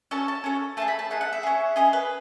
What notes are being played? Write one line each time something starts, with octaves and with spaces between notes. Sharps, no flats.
C#4 F#4 A4 A5
A5
C#4 F#4 A4
A3 D#4 G#4 A5
B5
A5
A3 D#4 G#4 F#5
F#5
E5
C#4 G#4
C#4 G#4 D#5
B4